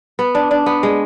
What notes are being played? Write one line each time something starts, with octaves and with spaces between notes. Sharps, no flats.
B3
D4
D4
B3
G#3